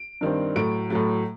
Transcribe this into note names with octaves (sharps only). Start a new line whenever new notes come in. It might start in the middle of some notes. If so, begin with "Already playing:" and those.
Already playing: D7
G2 D#3 G3 C4
A2 F#3 A3 D7
A2 F#3 A3